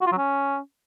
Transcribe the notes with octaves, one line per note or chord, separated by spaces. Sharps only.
F#4
F4
F#3
C#4